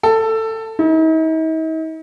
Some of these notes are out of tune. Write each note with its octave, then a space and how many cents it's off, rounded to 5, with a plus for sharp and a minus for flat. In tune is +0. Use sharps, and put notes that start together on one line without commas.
A4 +15
D#4 +45